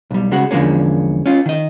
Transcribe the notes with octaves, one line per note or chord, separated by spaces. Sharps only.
B1 G3
C#3 G#3 F#4
E2 D3 F3 G#3 A#3 C#4
C#4 F4
D#3 D#5